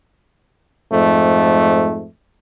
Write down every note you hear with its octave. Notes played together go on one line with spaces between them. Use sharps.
F2 G#2 A3